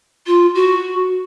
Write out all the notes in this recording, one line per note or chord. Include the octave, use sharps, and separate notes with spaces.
F4
F#4